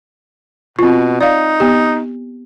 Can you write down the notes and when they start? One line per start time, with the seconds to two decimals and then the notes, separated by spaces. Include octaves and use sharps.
0.79 B2 C4 F4
1.21 D#4 D5 F5
1.60 B3 G4